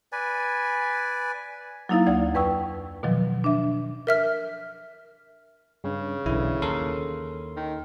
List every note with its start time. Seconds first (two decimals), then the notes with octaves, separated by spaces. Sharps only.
0.12 B4 D5 G#5
1.89 F#3 A#3 D#4 E4 F5 A6
2.06 D2 D5 F#5 G#6
2.34 F2 B4 G5 C#6 E6
3.03 B2 D#3 F3 F#3
3.44 D4 E5
4.07 A#4 E5 F6
5.84 G2 C#3
6.26 B1 D3 E3 E4
6.62 D#2 A4 A#4 C6
7.56 D#3